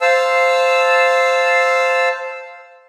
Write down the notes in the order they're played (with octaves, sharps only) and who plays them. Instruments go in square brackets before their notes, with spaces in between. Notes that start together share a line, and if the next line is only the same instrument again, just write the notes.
[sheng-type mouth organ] C5 F5 A5 E6